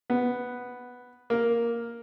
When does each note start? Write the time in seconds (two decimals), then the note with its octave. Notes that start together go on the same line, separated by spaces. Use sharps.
0.10 B3
1.30 A#3